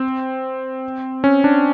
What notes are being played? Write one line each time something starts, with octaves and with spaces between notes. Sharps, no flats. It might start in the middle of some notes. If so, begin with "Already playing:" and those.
Already playing: C4
C#4
D4